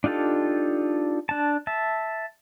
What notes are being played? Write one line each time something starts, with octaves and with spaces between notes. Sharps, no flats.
D4 D#4 F4 G4 A4
D4 A5
E5 A5